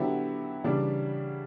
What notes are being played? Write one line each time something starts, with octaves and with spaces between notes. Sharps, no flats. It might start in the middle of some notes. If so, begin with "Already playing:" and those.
Already playing: D3 F#3 B3 E4 G4
C#3 E3 G3 D4